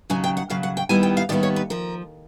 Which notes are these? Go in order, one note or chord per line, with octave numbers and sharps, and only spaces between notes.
D#2 C#3 F#3 G#5
G5
F#5
D#2 C#3 F#3 F5
F#5
G5
D#2 D#3 G3 B3 E4 G#5
G5
F5
D#2 D#3 G3 B3 E4 D5
C#5
B4
F3 A#4